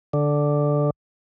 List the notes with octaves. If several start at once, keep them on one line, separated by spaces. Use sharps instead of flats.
D3